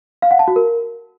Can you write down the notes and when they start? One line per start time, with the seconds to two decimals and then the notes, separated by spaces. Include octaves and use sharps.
0.22 F5
0.31 F#5
0.39 A5
0.48 F#4
0.56 A#4